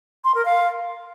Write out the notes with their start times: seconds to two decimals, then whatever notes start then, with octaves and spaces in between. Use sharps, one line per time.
0.24 C6
0.35 A#4
0.45 F5